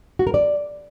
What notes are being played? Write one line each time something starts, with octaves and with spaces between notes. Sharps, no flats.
F#4
A#4
D5